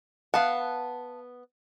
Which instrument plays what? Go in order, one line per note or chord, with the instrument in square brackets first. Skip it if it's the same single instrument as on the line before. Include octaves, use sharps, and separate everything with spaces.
[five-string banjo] B3 F#5 [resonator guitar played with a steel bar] F5 A5